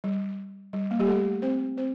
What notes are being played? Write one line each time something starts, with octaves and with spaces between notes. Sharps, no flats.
G3
G3
A#3
G3 G4
A3 A4
C4 C5
C4 C5